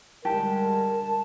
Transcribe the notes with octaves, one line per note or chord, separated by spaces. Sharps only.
D3 G3 G#3 G4 A#4 A5